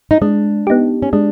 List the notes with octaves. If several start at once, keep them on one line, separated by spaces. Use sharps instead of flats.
D#4
G#3 D4
B3 D#4 G4
C#4
G#3 D4